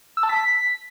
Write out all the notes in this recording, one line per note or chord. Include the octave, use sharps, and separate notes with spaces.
E6
A5
B6